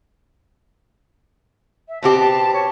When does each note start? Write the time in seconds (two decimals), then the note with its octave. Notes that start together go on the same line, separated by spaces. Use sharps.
1.89 E5
2.02 B2 C4 G4 A5
2.20 A5
2.54 C#5